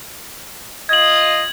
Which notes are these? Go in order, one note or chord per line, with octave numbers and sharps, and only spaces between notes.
F4 D#5 G#6 F#7